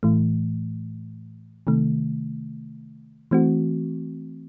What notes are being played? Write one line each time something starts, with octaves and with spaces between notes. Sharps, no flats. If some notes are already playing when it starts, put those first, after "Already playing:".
A2 E3 A3
C3 D#3 A3
E3 A3 C4 F#4